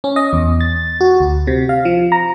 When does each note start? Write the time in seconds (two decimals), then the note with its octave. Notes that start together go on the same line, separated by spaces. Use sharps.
0.04 C#4
0.16 D#5
0.33 E2
0.61 A6
1.01 F#4
1.20 D2
1.47 C3
1.69 F5
1.85 F3
2.12 A#5